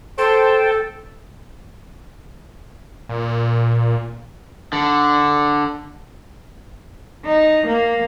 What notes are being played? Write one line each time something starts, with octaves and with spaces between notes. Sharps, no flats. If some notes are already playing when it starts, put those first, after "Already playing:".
A4 C5 G5 A5
A#2
D3
D#4
A#3